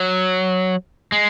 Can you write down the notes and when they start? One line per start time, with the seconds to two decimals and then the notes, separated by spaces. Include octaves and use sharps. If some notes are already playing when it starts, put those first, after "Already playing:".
Already playing: F#3
1.12 G#3